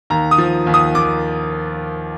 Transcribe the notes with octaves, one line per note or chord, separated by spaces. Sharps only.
D#2 A#5
D#6
F3
D#2
D#6
D#2 D6